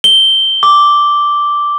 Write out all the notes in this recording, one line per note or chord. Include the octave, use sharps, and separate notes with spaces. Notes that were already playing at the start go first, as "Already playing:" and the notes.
G7
D6